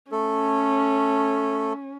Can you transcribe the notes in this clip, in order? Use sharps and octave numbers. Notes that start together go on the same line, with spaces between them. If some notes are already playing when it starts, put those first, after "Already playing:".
A3 C#4 A4